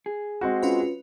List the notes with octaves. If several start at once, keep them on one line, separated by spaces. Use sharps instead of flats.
G#4
G#3 C4 F#4
C#4 F4 B4